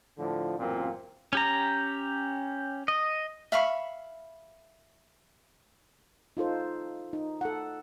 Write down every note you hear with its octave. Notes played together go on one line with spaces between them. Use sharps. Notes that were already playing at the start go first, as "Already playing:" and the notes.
A2 D3 F3
A1 F#2 A#2 C4 F4
C#4 G4 A#5
D#5
E5 F5 B5 C#6
D#4 F4 A4 C5
D#4
A4 F#5